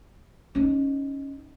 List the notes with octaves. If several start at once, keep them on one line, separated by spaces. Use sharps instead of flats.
C#4 D#4